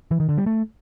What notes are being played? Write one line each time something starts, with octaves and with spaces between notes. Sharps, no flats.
E3
D#3
D3
G3
A3